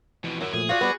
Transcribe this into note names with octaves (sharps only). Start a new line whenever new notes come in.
F2 B2 E3
F#2 F#3 E4
A#2 F3 A3 G#4
F4 F#4 D5
G3 B3 D5